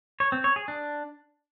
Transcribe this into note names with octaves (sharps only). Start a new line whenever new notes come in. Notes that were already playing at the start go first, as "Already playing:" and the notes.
C#5
C4
C#5
G#4
D4